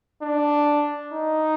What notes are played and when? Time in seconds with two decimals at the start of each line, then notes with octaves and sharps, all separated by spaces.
0.22 D4
1.13 D#4